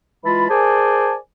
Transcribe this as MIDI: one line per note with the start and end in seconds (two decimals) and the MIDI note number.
0.25 0.44 52
0.25 0.44 56
0.25 0.44 65
0.25 0.44 81
0.25 0.44 83
0.49 1.15 68
0.49 1.15 70
0.49 1.15 72
0.49 1.15 74
0.49 1.15 80
0.49 1.15 81